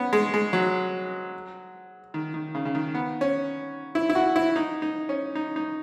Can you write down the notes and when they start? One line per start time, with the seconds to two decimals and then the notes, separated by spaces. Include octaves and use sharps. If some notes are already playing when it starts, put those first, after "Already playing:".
Already playing: B3 C#4
0.13 G#3
0.34 G#3
0.53 F#3
2.14 D#3
2.34 D#3
2.55 C#3
2.65 C#3
2.75 D#3
2.95 B3
3.21 C#4
3.95 E4
4.10 E4
4.15 F#4
4.36 E4
4.56 D#4
4.82 D#4
5.09 C#4
5.35 D#4
5.56 D#4